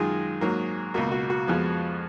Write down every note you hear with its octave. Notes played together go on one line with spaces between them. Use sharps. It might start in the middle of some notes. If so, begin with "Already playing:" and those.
Already playing: F#2 D#3 G#3 F4 G#4
G#2 F#3 A#3
C#2 B2 A#3 F#4
F#4
F#4
F2 F3 G#3 B3